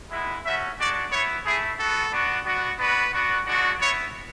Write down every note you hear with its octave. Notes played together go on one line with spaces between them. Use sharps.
G#3 B3 E4
A3 C#4 F#4 E5
G#3 D4 F#4 D5
B3 E4 C#5
A3 E4 G#4
B3 F#4 A4
B3 D4 F#4
B3 D4 F#4
B3 D4 F#4 B4
B3 D4 F#4
G#3 D4 F#4
B3 E4 C#5